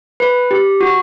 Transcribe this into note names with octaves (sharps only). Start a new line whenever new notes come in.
B4
G4
F#4